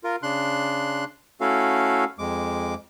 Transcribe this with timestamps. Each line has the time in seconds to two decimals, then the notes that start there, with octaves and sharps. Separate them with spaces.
0.04 F4 A#4
0.23 C#3 D4 C6 F#6
1.41 A3 C#4 E4 F#4 A4 F5
2.19 F2 G#3 D6